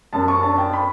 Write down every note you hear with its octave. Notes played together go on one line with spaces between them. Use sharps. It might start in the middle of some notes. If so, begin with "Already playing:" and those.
F#2 A5
C#6
D4 A5
G5
B5